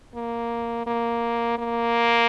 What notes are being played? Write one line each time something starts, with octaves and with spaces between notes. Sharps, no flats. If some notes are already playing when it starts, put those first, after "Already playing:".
A#3
A#3
A#3